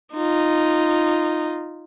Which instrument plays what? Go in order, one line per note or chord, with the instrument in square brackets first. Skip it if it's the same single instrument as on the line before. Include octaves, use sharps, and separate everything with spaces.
[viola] D#4 F4